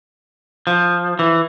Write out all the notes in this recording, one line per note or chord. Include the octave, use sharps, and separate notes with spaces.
F3
E3